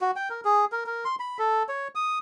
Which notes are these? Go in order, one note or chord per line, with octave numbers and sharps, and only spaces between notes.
F#4
G5
A#4
G#4
A#4
A#4
C6
B5
A4
C#5
D#6